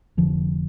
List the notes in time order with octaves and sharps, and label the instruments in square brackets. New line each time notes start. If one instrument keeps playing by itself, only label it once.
[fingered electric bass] F1 F2 D3 F3